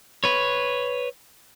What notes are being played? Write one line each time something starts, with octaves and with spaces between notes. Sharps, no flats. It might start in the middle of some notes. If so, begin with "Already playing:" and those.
B4 C#5